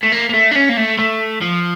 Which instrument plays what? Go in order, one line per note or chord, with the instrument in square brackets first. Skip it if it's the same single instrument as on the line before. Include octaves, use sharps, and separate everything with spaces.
[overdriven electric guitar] A3
A#3
A#3
A3
D4
C#4
A#3
A3
A3
F3